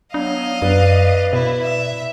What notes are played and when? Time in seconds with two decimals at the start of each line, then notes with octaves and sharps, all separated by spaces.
0.14 F#3 B3 D4 D#5 F5
0.62 F#2 B4 D5
1.33 B2 E4
1.62 E5